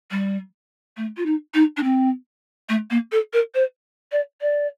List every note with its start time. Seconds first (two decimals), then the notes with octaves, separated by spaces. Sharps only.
0.11 G3
0.96 A3
1.17 F4
1.25 D#4
1.54 D#4
1.76 D4
1.83 C4
2.69 A3
2.90 A#3
3.11 A4
3.33 A#4
3.54 C5
4.12 D5
4.41 D5